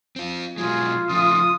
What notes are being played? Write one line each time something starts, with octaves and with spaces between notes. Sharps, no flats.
C4 F4
B2 F#3 G#3 F4 G#4
C#3 F3 A3 D#6